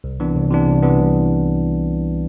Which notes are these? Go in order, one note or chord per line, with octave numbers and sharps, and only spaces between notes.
C2
C3 E3 B3 D4
C2
C3 E3 B3 D4
C2
C3 E3 B3 D4
C2